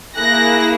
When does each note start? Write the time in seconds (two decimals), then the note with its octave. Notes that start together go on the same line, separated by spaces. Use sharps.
0.17 A#3 E4 G#4 F#6 A#6